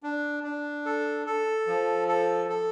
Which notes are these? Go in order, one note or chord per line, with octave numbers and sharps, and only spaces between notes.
D4
D4
A4
A4
F3
A4
A4